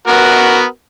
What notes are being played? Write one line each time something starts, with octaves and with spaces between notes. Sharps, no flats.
B3 F#4 A#4